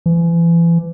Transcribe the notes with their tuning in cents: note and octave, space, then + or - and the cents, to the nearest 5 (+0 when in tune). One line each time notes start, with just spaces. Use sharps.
E3 +35